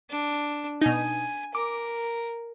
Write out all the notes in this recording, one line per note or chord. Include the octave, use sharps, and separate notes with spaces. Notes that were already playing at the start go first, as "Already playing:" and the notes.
D4
B2 D#4 G#5
A#4 D6